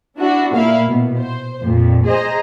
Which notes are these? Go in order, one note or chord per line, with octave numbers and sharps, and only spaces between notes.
D4 E4 F#4
A#2 A#3 E4 F5
B2
C5
F2 A#2
G#4 C5 D#5 A#5